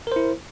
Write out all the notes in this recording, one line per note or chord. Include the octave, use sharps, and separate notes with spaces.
E4 A#4 C5